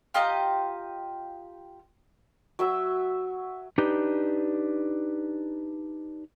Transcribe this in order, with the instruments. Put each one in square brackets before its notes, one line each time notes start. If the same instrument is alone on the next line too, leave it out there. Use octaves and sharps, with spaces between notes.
[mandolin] F4 G4 D#5 A#5
[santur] F#3 E5 E6
[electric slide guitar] D4 D#4 G4 B4